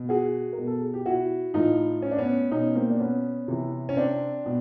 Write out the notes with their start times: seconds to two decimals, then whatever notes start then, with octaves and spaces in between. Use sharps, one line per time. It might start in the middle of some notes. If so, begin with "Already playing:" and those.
Already playing: B2
0.09 F#4 G#4
0.53 B2 A#4
0.67 A4
0.80 G#4
0.94 G4
1.06 E4 F#4
1.54 A2 E3 D#4 F4
2.02 C#4
2.11 D4
2.18 B3 C#4
2.51 B2 C#4 D#4
2.75 A#3 C4
2.90 D4
3.00 B3 C#4
3.48 C3 E3
3.89 C#4
3.96 C4 D4
4.46 B2